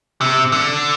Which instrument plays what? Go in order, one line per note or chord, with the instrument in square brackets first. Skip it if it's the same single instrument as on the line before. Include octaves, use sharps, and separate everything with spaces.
[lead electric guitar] C3
D3